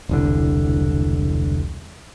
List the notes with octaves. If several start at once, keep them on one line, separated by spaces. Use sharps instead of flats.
E1 C2 D3